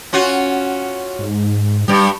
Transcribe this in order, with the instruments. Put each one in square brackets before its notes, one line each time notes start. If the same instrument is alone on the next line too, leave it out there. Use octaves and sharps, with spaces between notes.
[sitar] C#4 F4 F#4
[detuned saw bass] G#2
[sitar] G2 G4 [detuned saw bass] G3